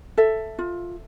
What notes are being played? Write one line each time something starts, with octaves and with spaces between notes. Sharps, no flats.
A4 E5
F4